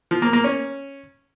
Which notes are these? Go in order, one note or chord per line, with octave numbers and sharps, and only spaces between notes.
F3
A#3
A#3
C#4